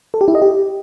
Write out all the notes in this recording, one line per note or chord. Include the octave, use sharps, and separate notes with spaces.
A4
G4
E4
D#5
G4